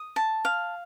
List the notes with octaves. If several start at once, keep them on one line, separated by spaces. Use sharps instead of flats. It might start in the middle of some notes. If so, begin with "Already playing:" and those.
Already playing: D#6
A5
F5